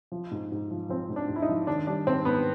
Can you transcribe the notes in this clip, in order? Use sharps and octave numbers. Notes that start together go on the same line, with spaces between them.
F3
G#2
G#2
F3
F3 C4
G#2
D4
G#2
E4
D#4
F3
D#3 D4
G3 D4
G#2 C4
G#2 B3